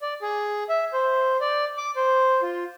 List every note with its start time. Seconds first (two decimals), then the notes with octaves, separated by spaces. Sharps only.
0.02 D5
0.22 G#4
0.69 E5
0.93 C5
1.41 D5
1.77 D6
1.96 C5
2.42 F4